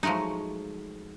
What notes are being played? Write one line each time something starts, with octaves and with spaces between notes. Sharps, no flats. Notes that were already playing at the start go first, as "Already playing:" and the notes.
F3 F#3 G#3 A3 D#4